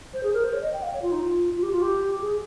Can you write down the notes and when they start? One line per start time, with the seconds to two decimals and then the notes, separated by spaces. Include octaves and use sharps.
0.13 C5
0.23 G#4
0.33 A#4
0.43 C5
0.52 C#5
0.62 D#5
0.73 G5
0.82 F5
0.93 C#5
1.01 F4
1.12 D#4
1.21 F4
1.55 F4
1.62 G4
1.72 F4
1.81 G4
2.21 G#4